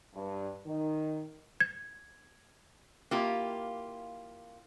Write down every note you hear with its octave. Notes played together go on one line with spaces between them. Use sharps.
G2
D#3
G#6
A#3 E4 F4 G4